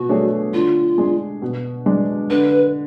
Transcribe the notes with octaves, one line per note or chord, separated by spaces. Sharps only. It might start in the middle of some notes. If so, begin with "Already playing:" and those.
Already playing: B2 F#4
A3 D4 G#4 C#5
D3 F4
G#3 D4 G#4
B2
G#3 D4
D3 B4